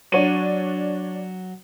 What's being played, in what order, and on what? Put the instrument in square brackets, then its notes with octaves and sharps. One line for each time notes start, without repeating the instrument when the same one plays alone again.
[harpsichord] F#3 [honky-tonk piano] D4 C#5 D#7